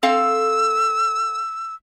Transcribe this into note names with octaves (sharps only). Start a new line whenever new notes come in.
C4 A4 F5 E6